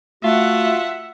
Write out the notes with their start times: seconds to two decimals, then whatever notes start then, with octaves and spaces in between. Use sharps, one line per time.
0.24 A3 F4 F#4 E5 F#5